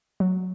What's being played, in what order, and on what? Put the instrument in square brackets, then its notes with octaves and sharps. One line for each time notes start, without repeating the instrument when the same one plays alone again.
[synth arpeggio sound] F#3